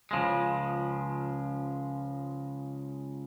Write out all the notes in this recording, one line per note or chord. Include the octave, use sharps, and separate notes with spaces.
C#2 C#3 F3 G#3